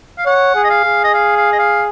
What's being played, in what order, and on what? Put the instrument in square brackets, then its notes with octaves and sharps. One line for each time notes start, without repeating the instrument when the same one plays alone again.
[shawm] F5
[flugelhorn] C#5 [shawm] F#5
[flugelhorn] G#4
[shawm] D#5
F5
[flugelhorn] G#4
[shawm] D#5
F5
F5
D#5
F5